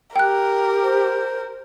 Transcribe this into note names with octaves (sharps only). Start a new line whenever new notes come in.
G4 A#4 G5 F#6
C5